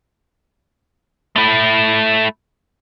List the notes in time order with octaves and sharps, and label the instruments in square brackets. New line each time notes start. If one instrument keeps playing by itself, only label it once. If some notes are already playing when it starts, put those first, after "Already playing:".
[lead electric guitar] A3 E4